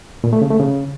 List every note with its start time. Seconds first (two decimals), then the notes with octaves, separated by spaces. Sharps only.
0.24 A#2
0.33 A3
0.42 C#3
0.51 A3
0.60 C#3